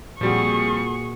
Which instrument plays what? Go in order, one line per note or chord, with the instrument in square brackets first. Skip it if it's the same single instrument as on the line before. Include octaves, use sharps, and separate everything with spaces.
[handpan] A#2 F#4 [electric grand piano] F3 G3 C4 [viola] G#4 C#6